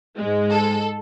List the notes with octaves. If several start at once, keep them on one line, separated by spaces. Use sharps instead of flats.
G#2 G#3
A4